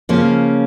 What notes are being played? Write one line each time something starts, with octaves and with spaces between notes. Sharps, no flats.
C#3 F3 A#3 C#4